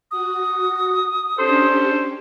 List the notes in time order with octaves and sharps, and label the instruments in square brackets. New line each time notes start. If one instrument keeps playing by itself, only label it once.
[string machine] F#4 [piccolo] D#6
[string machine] C#4 D4 G4 [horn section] A4 C5